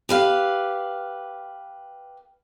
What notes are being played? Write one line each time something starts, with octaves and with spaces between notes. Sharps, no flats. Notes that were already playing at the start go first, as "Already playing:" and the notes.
G4 B4 F5